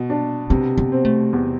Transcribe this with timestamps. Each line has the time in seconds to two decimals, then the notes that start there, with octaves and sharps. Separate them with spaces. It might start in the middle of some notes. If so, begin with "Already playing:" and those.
Already playing: B2
0.10 D4
0.50 C3 B3
0.78 B3
0.92 C4
1.05 A3
1.33 E2